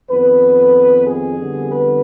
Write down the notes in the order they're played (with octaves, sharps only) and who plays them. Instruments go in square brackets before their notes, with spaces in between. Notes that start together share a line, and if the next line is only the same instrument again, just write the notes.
[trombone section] F2 D#3 B3 B4
G#4
F2 D3 G3 B3
B4